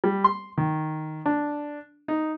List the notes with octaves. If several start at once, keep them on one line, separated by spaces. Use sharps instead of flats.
G3
C6
D#3
D4
D#4